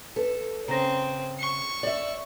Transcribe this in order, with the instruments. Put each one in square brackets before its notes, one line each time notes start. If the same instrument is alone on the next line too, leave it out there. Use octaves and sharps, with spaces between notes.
[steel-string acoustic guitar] A4 [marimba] B4
[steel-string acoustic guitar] C#3 [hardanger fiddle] C4 [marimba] A#5 A#6
[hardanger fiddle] C#6
[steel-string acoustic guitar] D5 E5